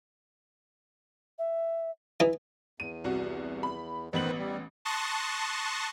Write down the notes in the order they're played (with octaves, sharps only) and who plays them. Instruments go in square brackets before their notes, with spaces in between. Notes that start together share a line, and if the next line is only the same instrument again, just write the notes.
[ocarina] E5
[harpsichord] E3 D#4 [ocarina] E4
[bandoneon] E2 [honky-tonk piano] D#7
[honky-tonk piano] C2 F#4
B5
[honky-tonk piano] A1 B3 F#7 [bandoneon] D#3 B4 C5
[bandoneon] G3
[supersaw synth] A5 C6 C#6 D#6 F#6 A#6